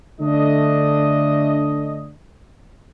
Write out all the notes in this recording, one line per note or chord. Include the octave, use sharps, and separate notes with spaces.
D3 A3 D4 D#5